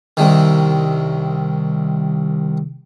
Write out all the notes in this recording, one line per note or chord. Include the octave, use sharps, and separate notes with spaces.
C2 D#3